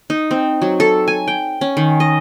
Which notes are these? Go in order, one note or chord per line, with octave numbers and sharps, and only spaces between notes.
D#4
C4
F#3
A4
G#5
G5
C#4
D#3
D#5